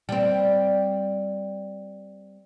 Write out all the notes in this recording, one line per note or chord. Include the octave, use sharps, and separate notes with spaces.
G3 C4